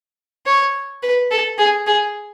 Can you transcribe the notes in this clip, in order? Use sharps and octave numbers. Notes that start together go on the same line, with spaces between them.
C#5
B4
A4
G#4
G#4